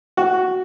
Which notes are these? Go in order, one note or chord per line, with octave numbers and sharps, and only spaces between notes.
F#4